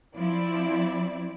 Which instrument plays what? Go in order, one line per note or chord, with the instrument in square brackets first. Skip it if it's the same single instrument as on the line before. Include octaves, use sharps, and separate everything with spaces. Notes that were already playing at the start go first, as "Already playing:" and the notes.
[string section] F3 C4 E4 D5